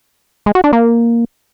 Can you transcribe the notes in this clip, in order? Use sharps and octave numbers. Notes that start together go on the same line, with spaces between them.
G#3
F#4
D4
A#3